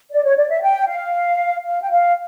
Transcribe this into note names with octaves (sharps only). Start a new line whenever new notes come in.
D5
C#5
D5
E5
G5
F5
F5
G5
F5